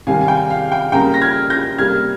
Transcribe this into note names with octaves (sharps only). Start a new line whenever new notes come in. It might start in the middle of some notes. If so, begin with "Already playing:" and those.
C3 D#3 G3 F5 G#5
G#5
G5
F5
G5
C#3 G3 A#3 G5 A#5
A#6
F6 G#6
G6 A#6
C3 G3 A#3 F6 G#6